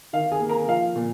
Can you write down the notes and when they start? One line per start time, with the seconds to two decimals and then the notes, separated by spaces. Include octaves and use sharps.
0.13 D#3 F5
0.31 G#4 G#5
0.40 A#3
0.49 A#4 A#5
0.68 F3 F5
0.95 A#2